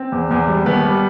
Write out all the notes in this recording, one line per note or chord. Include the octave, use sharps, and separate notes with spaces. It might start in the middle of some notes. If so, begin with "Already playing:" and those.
Already playing: C4
E2
E2
G3
D#2 B3 B4
G3